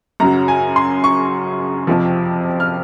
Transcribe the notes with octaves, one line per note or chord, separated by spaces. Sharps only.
F#2 C#3 F#3 A#5
G#5
C6
C#6
F2 C3 F3
F6